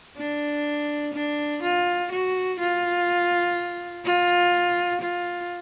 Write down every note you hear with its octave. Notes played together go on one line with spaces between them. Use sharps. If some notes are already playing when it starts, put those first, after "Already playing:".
D4
D4
F4
F#4
F4
F4
F4